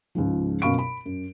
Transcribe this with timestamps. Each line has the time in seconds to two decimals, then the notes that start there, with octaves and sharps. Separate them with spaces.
0.15 C#2 G#2 F3
0.62 F#2 B2 F5 B5 C#6 D7
0.79 B5
1.06 F#2